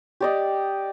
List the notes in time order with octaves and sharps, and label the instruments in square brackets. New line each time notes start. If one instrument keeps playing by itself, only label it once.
[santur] G4 D5 D#5